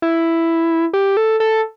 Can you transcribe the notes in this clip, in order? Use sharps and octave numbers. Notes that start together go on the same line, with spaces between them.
E4
G4
A4
A4